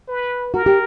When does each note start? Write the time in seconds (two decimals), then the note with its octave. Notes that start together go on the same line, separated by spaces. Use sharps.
0.08 B4
0.54 F#4 A#4
0.66 G4